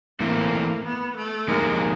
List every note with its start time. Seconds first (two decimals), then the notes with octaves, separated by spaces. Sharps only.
0.20 E3 A3 A#3 C4 E4 A4
0.84 B3
1.17 A3
1.48 F3 G#3 A#3 D#4 G4 A#4